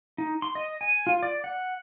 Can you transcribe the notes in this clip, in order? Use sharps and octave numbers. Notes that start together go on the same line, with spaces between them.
D#4
C6
D#5
G#5
F4
D5
F#5